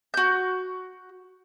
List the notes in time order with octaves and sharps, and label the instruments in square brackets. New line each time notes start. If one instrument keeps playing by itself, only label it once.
[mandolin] F#4 G6